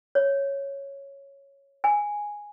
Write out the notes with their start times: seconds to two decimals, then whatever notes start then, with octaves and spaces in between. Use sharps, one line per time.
0.15 C#5
1.84 G#5